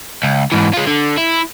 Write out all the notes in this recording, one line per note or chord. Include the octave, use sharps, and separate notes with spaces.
C#2
G#2 E3
G#3 F4
D3
E4